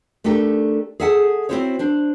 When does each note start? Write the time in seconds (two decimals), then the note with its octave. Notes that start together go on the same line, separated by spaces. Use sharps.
0.24 A3 D4 D#4 G4 A4 A#4
1.00 G#4 A4 E5 F#5 G#5 A5
1.49 C4 D#4 E4 F#4 C5 C#5
1.79 D4 C5